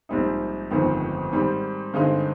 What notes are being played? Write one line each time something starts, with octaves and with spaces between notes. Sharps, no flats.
A#1 G#2 G3 C4 D#4
G1 F2 D#3 G#3 C4
G#2 D#3 G3 C4
G2 D3 G#3 C4 D#4 C5